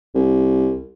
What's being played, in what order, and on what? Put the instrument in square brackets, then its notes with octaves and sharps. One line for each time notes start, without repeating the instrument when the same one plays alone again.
[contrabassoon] C2